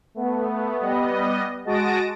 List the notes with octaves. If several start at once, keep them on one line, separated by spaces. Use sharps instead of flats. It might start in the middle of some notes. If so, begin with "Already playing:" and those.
A3 B3
G3 B3 D#5
G#3 F#4 A5 D#6 A#6 D7